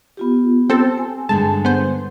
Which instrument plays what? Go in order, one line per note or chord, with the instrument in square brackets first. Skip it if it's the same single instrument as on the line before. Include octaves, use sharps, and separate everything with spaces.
[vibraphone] B3 F4 G4
[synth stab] C4 A4
[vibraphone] G#5
[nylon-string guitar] G2 D3 G#3 [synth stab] A5
[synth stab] B3 C5